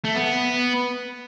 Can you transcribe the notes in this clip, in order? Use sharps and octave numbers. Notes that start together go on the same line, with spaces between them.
A3
B3